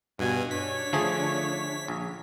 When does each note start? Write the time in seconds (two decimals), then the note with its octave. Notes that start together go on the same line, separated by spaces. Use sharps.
0.19 G2 B2 F#4 G#5
0.51 D4 C#5 B6
0.93 D3 F3 A3 G#4
1.88 A#1